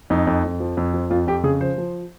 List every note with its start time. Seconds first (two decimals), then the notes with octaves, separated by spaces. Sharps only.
0.10 F2 D#4
0.27 F2
0.44 F2
0.60 F3
0.77 F2
0.94 F3
1.10 F2 F4
1.27 F2 G4
1.44 C#3 G#4
1.61 F3 C5
1.78 F3